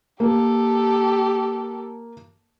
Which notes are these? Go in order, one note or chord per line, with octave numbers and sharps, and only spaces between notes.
A#3 G4 A4 A#4